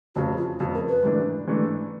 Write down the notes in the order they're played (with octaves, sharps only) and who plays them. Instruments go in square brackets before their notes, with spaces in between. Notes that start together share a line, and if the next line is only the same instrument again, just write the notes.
[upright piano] F1 F2 C#3 [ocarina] F#4
[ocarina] F4
[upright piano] F1 F2 C#3 [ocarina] F#4
[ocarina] A#4
B4
[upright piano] G#2 E3 A3 D4
G#2 E3 A3 D4